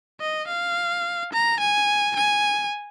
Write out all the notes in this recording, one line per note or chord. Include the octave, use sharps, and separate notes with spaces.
D#5
F5
A#5
G#5
G#5